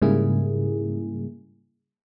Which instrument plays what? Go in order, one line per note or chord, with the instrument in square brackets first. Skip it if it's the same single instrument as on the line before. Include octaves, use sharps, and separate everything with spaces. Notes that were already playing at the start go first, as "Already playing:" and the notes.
[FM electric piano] G#2 C#3 G3 A#3 E4 G#4